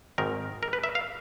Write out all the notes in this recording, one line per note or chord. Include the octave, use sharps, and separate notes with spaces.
G#1 G#2 D#3 A#4
A#4
B4
E5
F5